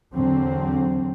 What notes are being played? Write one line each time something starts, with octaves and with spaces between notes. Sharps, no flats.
E2 D3 F#3 C4